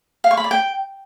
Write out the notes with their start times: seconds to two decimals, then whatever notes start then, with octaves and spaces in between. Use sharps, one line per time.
0.24 F5
0.31 C#6
0.37 B5
0.44 D5
0.51 G5